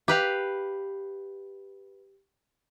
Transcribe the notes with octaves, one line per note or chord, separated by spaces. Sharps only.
G4 B4 F5